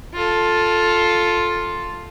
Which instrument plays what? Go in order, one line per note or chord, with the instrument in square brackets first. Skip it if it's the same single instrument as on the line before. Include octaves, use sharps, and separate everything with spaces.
[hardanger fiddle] F4 A4